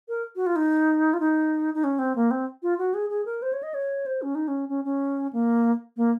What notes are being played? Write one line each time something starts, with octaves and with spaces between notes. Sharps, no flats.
A#4
F#4
F4
D#4
F4
D#4
D#4
C#4
C4
A#3
C4
F4
F#4
G#4
G#4
A#4
C5
C#5
D#5
C#5
C5
C#4
D#4
C#4
C#4
C#4
A#3
A#3